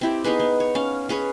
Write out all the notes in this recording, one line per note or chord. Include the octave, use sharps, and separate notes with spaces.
C4 E4 G4
B3 D#4 G#4 B4
B3
C#5
C#4 F5
C#4 G#4 B4 C#5